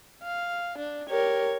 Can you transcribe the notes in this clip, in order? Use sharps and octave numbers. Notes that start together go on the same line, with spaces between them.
F5
D4
G4 A#4 C#5